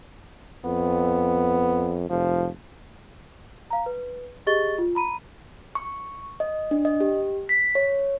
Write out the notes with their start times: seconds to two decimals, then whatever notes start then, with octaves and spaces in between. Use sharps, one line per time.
0.65 F2 B3
2.10 F1 F3
3.70 F5 A#5
3.86 B4
4.47 G4 G#4 D#5 C#6 A6 G7
4.78 F4
4.95 A#5 B5 D#7
5.75 C#6
6.40 D#5
6.71 D4
6.85 D#5
7.01 G4
7.49 B6
7.75 C#5